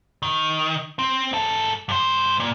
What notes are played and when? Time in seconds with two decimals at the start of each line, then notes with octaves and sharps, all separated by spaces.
0.22 D#3
0.99 C4
1.34 G#2 A4
1.89 G2 C5
2.40 A#2